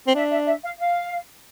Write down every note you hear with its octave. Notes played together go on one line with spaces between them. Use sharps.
C4
D4 E5
E5
E5
F5
F5